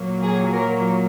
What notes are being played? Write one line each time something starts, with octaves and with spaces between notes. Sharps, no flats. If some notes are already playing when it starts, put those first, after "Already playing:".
Already playing: A#2 F#3 A#3
G#4
A#4